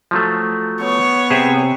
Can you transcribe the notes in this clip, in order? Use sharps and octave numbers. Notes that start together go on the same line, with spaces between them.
F3 F#3 A3
B3 C#5
C3 G#4 C5 E5